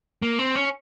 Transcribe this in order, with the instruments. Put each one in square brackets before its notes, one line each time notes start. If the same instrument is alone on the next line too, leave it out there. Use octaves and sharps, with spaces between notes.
[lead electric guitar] A#3
C4
C#4